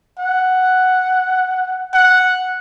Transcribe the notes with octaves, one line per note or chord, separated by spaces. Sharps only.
F#5
F#5